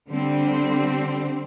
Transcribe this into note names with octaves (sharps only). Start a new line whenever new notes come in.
D3 G3 C4